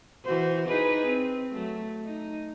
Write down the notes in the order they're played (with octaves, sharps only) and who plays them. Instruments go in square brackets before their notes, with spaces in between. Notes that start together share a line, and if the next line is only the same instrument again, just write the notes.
[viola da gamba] E3 F#4 C5
D#4 G#4 B4
C4
F#3 A3
D#4